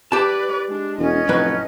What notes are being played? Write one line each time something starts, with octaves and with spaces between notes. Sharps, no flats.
G4 B4 D5 A5
G#3 D4
E1 C#4 D#5
F1 A2 F#3 B4